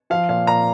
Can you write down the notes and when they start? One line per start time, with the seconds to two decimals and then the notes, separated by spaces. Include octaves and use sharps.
0.10 F3 F5
0.29 A#2 F5
0.47 A#2 A#5